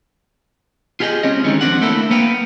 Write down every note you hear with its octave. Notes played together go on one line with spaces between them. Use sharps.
F4 G4 G#4 D#5 G5
C#2 C4 C#4 D#5
D#3 E3 G3 G#3 C#4
F2 C4 D4 F#5
A3 A#3 E4 A4
A#3 B3 B4 F5 G5